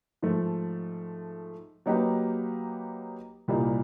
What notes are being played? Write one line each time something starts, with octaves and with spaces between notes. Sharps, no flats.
G#2 F3 A3
F#3 A#3 D#4 G4 B4
C2 A#2 G3 A#3 D#4